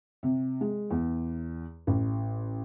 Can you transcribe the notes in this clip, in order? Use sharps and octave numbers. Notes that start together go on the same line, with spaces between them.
C3
G#3
E2
A1